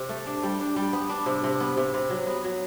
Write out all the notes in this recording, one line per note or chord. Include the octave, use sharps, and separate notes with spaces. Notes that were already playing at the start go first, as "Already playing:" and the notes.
Already playing: C3
A3
D4
G3
D4
G3
B3
D4
C3
C3
B3
C3
C3
F#3
B3
F#3